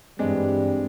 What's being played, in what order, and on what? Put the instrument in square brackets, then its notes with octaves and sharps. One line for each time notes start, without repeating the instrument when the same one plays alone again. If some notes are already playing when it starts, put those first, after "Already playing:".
[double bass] G2 E3 [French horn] G3 [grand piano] G#3 D4 [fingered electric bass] C4